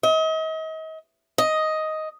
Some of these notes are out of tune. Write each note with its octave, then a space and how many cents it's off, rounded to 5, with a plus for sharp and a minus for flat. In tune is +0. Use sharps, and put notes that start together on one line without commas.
D#5 +40
D#5 +5